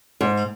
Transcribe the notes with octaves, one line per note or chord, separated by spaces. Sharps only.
G#2